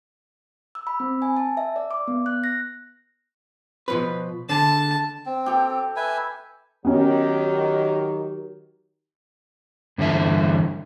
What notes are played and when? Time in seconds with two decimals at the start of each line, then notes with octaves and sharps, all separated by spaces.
0.75 E6
0.87 B5
1.00 C4
1.22 G#5
1.37 A5
1.57 E5
1.76 D5
1.91 D6
2.08 B3
2.26 F#6
2.44 A#6
3.88 B2 F3 B4
4.49 D3 A5
5.26 C4
5.46 G4 A4
5.96 B4 E5 G#5
6.85 D#3 F#3 B3 C#4 G4
9.98 G2 D3 E3 A4 E5